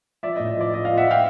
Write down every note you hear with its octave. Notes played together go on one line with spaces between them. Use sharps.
F3 D5 E5
D#5
A2
D#5
F3 D5
F3 D#5
F3 D#5 F5
E5 F#5
F3 F5 G5